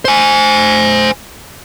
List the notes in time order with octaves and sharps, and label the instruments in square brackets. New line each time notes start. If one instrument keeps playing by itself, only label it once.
[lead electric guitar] C5 G#5